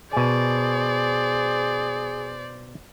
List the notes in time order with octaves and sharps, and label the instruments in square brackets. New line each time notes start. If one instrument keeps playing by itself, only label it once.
[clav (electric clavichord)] B2 G#5 [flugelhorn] G#4 [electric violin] C5 D5